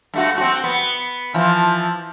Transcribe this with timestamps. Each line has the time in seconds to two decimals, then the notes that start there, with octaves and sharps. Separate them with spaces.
0.14 G2 A3 F#4
0.38 C4 F#4
0.64 B3
1.34 E3 F3